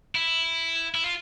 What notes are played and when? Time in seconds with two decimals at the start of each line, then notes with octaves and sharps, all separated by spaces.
0.15 E4
0.95 E4
1.04 F4